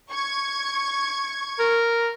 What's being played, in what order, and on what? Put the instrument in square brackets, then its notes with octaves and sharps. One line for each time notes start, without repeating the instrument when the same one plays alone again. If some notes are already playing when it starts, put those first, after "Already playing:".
[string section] C#6 G#6
[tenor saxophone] A#4